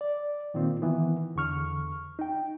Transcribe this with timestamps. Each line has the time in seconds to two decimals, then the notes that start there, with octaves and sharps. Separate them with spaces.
0.01 D5
0.54 A#2 D#3 A#3 C4 F4
0.82 D#3 E3 B3
1.36 E2 D3 C#6 F6
2.19 D#4 G5